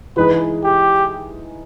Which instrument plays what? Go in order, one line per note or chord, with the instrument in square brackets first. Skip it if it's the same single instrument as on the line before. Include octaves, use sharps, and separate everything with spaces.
[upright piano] E3 G#3 D#4 G#4 [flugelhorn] B4
[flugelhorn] G4